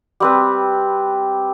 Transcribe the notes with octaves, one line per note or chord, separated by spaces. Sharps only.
G3 C4 B4